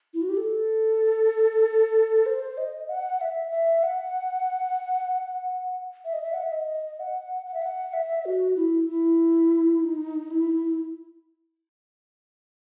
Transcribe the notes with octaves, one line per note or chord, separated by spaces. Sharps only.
E4
F#4
G4
A4
C5
D#5
F#5
E5
E5
F#5
E5
D#5
E5
F#5
E5
D#5
F#5
F#5
E5
F#5
E5
F#4
E4
E4
D#4
E4